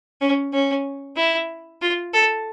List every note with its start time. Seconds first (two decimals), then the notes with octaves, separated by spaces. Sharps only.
0.21 C#4
0.53 C#4
1.16 E4
1.81 F4
2.14 A4